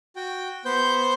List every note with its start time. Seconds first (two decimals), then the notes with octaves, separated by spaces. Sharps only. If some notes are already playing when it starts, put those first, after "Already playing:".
0.16 F#4 G5
0.65 B3 C5 G6